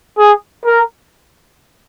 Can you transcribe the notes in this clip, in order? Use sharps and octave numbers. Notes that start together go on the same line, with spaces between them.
G#4
A#4